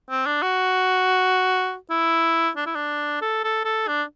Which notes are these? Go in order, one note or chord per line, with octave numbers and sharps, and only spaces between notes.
C4
D4
F#4
E4
D4
E4
D4
A4
A4
A4
D4